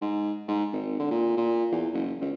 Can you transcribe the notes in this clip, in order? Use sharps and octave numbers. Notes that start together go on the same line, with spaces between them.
G#2
G#2
G#1
D3
A#2
A#2
E2
F#1
C#2